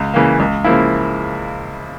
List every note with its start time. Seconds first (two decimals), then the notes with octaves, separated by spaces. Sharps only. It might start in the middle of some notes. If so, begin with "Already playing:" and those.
Already playing: C#2
0.14 C#3 E3 A#3
0.40 C#2
0.64 C#3 F3 A#3 E4